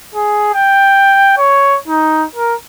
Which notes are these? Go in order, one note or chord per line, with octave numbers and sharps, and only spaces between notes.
G#4
G5
C#5
D#4
A#4